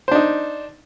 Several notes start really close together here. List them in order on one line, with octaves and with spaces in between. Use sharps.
C5 D4 D#4